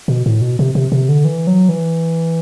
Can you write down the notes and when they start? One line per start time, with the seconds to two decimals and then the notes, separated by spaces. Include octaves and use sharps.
0.08 B2
0.26 A2
0.41 B2
0.59 C3
0.75 C3
0.92 C3
1.09 D3
1.25 E3
1.47 F#3
1.69 E3